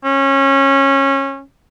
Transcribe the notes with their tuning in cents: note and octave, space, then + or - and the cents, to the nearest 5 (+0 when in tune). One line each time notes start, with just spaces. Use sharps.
C#4 -20